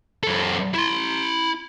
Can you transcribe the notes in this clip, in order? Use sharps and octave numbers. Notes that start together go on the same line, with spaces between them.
F#2 A4
E4 C6